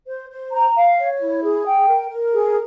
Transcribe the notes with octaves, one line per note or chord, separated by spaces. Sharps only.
C5
C5
A#5
F5
C#5
E4
G#4
G5
A#4
A#4
G#4